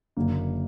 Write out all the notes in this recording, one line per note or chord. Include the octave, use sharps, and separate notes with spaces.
F#1 F#2 D3 A#3